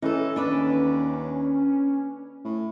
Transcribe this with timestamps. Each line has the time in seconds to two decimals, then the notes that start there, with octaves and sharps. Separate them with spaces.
0.02 E3 C#4 D#4 A4
0.36 D#2 D4 B4 D5
2.44 A2